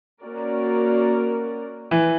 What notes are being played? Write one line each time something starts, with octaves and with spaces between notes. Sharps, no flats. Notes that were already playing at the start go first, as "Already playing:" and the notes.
A#3 C#4 F#4 A#4 D5
E3